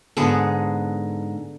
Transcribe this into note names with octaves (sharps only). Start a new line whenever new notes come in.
G#2 D3 B3 G#4 A4